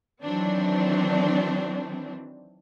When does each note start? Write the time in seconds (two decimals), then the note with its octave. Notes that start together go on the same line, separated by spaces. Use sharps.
0.23 D#3 E3 F#3 C4 D4